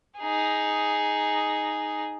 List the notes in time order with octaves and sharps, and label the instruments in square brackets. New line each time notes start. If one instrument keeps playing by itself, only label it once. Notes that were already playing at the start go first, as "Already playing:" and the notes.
[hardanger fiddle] D#4 G#4